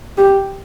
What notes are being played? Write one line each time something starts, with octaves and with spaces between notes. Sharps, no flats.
G4